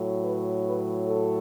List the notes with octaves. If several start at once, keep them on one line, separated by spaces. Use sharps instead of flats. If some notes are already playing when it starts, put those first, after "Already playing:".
Already playing: A2 F#3
B4
B4
A4